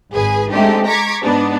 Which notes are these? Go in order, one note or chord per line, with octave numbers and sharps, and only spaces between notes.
G#1 G#4 B4 G#5
G#3 A3 C4 D4 D#4 G4
A#5 C#6 D6 G#6 B6
G#2 B3 D4 D#4